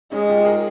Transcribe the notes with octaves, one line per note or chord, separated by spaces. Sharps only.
G#3 C#4 D#4
F4 G4
G#4 A#4